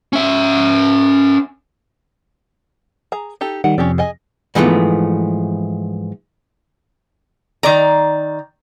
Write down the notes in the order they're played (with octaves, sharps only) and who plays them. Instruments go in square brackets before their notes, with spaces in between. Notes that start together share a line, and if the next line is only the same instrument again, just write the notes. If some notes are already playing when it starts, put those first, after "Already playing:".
[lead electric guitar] C#4 E5
[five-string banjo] G#4 A#5
D#4 G4 A4
[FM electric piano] D#3 G3 [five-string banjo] F#5
[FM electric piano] F2 C3 [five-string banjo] C#4 G4 D5
[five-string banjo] G#4 D#5 G#5
[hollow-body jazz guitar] G#2 E3 F3 A3 B3
[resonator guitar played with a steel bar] D#3 D5 A#5